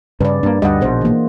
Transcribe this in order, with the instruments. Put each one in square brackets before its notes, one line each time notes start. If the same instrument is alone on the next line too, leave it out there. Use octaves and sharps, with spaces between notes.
[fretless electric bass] G2 C#3 [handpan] B4 D5
[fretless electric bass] G2 A#3 [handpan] D4
[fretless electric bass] D2 G2 G3 [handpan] D#5 F#5
[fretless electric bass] A#1 B2 [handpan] G#4 C5
[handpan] E3 A#3